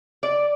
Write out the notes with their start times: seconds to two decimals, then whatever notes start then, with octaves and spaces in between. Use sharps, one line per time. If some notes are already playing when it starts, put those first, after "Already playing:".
0.23 D5